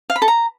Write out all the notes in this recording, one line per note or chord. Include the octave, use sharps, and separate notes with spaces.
F5
B5
A4
A#5